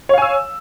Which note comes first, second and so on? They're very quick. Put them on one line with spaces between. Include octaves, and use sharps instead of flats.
C#5 F5 G#5 E6